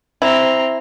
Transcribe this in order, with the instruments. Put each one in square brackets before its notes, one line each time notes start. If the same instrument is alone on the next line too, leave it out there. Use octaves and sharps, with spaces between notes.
[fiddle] C4 A#5 [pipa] E4